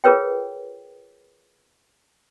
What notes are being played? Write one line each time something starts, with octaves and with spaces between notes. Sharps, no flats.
F4 G#4 A#4 B4 C#5 G5